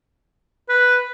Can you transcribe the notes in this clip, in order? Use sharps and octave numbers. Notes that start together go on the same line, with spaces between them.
B4